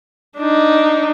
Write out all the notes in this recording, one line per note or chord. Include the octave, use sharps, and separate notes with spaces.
D4 D#4